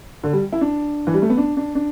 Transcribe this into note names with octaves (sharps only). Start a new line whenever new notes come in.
D3
G3
E4
D4
E3
G3
A3
B3
D4
D4
D4